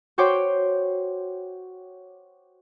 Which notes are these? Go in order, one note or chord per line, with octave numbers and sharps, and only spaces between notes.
F#4 C5 C#5 G5 D6